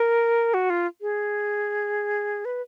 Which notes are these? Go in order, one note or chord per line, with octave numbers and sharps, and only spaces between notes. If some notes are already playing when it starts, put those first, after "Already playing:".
Already playing: A#4
F#4
F4
G#4
B4